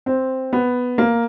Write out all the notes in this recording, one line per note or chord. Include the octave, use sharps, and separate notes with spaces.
C4
B3
A#3